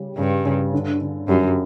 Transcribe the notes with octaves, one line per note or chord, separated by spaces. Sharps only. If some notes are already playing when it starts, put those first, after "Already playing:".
Already playing: C#3 G3
G2 C#3
C#3
D3
D3
F#2 G3